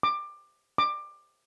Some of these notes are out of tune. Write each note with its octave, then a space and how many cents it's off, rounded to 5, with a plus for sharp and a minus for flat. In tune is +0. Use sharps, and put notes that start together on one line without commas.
D6 +20
D6 +20